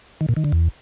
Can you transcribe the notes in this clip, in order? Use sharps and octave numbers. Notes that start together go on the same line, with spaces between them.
D#3
A#2
D#3
D3
E2